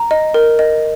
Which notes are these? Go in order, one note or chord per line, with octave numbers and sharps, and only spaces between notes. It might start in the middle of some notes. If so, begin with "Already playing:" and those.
Already playing: A#5
D#5
A#4
D#5